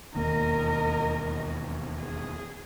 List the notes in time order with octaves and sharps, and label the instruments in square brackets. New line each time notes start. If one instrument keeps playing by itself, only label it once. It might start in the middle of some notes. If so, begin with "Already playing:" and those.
[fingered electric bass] E1 D#2 A#3 [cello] A#4 D#5
[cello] G#4